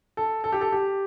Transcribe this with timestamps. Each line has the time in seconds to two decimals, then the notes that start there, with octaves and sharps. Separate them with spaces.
0.17 A4
0.44 A4
0.52 G4
0.61 A4
0.72 G4